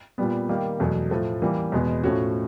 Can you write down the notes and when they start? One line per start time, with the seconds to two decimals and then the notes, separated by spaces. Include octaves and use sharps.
0.18 A#2 G3 B3
0.49 D#3 G3 A#3
0.80 E2 B2 F#3 A3
1.11 A2 F3 A3
1.42 E3 G3 A#3
1.72 E2 B2 G#3 B3
2.04 A2 F3 A3 C#4 F#4